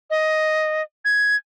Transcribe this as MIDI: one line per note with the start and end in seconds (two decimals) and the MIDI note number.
0.10 0.82 75
1.05 1.36 92